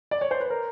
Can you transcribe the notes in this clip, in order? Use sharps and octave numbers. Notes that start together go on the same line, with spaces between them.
D5
C#5
C5
B4
A#4